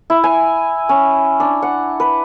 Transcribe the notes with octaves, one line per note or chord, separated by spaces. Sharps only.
E4
G#5
C#4
D4
F#5
B4